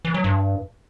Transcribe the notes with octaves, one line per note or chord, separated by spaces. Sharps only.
E3
F#3
G2